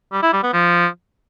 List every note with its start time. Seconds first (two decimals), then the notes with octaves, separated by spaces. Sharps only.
0.12 G3
0.23 E4
0.33 G3
0.43 B3
0.53 F3